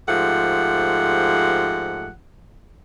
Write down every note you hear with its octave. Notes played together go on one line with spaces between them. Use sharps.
G#2 F3 A3 G4 F#5